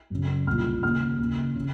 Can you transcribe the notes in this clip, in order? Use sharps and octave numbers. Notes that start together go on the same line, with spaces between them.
F#2 C#3
C2 A#2 F6
D#2 C#3 F6
D#2 C#3
C#3